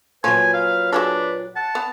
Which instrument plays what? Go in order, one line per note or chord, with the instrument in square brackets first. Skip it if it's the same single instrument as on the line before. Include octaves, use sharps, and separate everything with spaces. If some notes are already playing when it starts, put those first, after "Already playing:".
[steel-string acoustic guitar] A#2 F#3 [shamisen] F3 C#5 [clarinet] B4 [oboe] G#5
[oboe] F5
[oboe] D4 [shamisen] F#4 G#4 A4 [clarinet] B4
[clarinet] F#5 [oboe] A5
[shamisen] B3